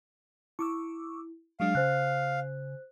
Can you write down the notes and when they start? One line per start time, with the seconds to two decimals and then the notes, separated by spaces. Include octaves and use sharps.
0.59 E4 C#6 D6 E6
1.60 F#3 G#3 D4 F5
1.75 C#3 C5 F#6